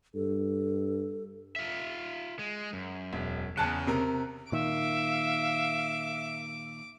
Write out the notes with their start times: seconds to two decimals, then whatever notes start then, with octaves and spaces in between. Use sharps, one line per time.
0.15 G2 A4
1.56 F4 E5
2.39 G#3
2.73 F#2
3.13 E1
3.57 E2 C#3 A5 F#6
3.87 C3 A#4
4.52 A#2 D#3 E5 F5 D6